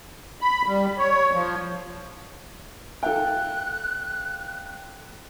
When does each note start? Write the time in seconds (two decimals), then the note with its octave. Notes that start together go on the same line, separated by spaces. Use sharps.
0.41 B5
0.66 G3
0.98 C#5
1.33 F3
3.03 A4 F5 G5 F#6